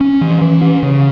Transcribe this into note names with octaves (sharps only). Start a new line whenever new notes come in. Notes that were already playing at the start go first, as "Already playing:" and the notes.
C#4
E3
E3
C#4
C#3